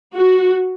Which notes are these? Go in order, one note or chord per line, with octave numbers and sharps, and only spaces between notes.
F#4